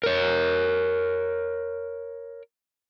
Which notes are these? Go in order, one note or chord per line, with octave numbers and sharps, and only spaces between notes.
A#4 C#5